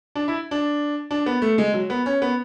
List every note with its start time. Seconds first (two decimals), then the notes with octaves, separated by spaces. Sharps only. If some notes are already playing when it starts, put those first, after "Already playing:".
0.15 D4
0.28 E4
0.51 D4
1.11 D4
1.26 B3
1.42 A3
1.58 G#3
1.74 F#3
1.90 B3
2.06 C#4
2.22 B3